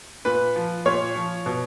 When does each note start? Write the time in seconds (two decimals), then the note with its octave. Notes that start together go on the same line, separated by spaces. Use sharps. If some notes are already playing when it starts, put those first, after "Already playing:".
0.25 A#2 B4
0.56 F3
0.86 A#2 C#5
1.15 F3
1.46 B2